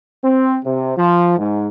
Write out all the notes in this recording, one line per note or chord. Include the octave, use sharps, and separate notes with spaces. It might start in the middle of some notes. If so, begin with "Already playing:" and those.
C4
C3
F3
G#2